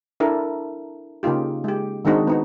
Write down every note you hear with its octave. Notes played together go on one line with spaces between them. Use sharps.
D4 E4 A4 A#4
C#3 A#3 D#4 F4 G4
G#3 G4
D#3 G#3 C4 D4 D#4 F#4
B3 D#4 F#4